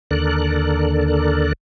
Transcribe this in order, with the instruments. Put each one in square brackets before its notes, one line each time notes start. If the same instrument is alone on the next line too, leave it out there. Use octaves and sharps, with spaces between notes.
[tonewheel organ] D#2 D3 A4 A#4 D5 F#6